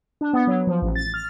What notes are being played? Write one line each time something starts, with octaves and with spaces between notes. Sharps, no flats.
D4
B3
F#3
F3
A1
A6
F6